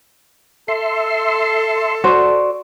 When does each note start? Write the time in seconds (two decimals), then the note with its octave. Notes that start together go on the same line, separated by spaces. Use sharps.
0.68 A4 E5 C6
2.04 F#4 C5 D5